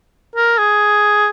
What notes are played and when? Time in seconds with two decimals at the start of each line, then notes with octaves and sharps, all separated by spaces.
0.36 A#4
0.58 G#4